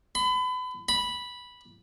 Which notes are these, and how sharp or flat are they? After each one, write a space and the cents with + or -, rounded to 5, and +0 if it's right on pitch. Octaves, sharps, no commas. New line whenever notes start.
B5 +35
B5 -5